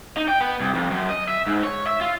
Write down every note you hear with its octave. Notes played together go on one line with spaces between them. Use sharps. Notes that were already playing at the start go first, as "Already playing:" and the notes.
D#4
G5
B3
C2
F2
F#2
D#5
E5
G#2
C#5
E5
F4